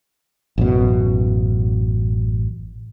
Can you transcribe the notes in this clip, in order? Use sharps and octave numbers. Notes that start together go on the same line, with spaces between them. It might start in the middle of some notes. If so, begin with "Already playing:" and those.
A1 F#2 B2